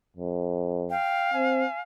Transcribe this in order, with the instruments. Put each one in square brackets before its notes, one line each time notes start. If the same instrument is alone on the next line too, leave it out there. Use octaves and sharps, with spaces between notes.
[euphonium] F2
[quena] F5 [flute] G5
[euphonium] C4 [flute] G#5